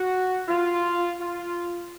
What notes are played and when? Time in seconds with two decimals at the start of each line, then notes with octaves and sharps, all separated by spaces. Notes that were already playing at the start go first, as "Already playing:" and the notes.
Already playing: F#4
0.48 F4
1.20 F4